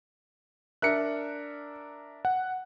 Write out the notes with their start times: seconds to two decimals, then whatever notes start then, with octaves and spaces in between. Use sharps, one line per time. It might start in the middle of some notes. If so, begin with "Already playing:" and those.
0.82 D4 A#4 E5 F#6 C#7
2.25 F#5